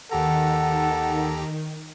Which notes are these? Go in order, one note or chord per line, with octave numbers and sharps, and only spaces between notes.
D#2 D#3 G4 A4 F#5 A#5